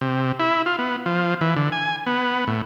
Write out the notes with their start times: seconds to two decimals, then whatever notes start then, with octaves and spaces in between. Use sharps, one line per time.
0.01 C3
0.40 E4
0.66 F4
0.79 B3
1.06 F3
1.41 E3
1.57 D3
1.72 G#5
2.07 B3
2.47 A2